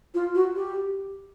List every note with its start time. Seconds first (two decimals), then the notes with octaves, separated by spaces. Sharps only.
0.14 F4
0.35 F#4
0.56 G4